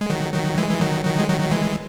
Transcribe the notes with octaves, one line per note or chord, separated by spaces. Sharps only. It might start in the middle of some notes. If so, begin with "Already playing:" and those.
G#3
D#3 F#3
D#3 F#3
E3 G#3
E3
D#3 F#3
D#3 F#3
G#3
D#3 F#3
F#3
E3 G#3